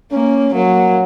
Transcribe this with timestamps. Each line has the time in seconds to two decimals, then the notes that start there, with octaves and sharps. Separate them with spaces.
0.12 A#3 C#4
0.54 F#3 A#3